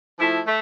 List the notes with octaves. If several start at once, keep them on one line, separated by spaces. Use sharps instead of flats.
F3 A3 E4
A3